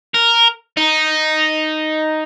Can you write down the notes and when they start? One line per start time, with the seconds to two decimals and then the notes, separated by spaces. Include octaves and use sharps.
0.14 A#4
0.77 D#4